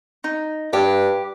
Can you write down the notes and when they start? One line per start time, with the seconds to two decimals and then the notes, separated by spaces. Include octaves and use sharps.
0.24 D#4
0.73 G2 G4